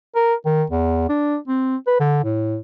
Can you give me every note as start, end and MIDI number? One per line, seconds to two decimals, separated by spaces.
0.15 0.34 70
0.45 0.64 51
0.70 1.08 40
1.09 1.37 62
1.48 1.76 60
1.87 2.00 71
2.00 2.22 50
2.24 2.58 45